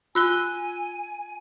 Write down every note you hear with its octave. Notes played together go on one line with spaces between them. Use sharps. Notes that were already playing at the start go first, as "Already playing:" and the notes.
F4 G#5 E6 F#6 G7